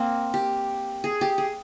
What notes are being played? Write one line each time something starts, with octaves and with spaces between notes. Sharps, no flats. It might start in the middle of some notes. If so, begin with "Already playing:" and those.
Already playing: A#3 C4
G4
G#4
G4
G#4